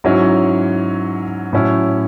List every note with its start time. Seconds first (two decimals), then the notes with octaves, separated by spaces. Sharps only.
0.04 G#2 F#3 C#4 E4
1.53 A2 F#3 C#4 E4